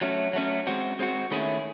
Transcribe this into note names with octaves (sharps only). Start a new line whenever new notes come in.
F#3 A3 C#4
F#3 A3 C#4
G#3 C4 F#4
G#3 C4 F#4
D#3 A3 C#4 E4 G#4